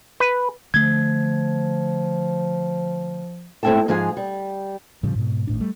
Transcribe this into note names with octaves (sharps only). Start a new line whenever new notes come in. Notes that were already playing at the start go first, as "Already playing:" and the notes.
B4
D3 F3 A3 G#6
G#2 A3 C4 E4 G5 A5
G#2 F3 G#3 G#4 F5
G3
A2 C#3 F3 G3
G#2 B2
G#1 A2 D4
G3 A3